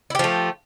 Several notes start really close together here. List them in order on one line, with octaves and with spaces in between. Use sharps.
E4 G4 F3 A3